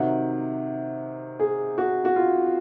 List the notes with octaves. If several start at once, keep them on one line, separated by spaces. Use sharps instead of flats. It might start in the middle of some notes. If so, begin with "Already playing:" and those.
Already playing: C3 D#3 F#3 F#5
G#4
F#4
F#4
F4